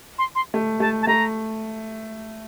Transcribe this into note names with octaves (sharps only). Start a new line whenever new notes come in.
C6
C6
A3
A3 A5
A5
A3 A#5